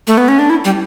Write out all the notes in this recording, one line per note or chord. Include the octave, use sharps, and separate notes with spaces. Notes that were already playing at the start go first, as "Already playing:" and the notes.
A3
B3
C#4
D4
E4
G3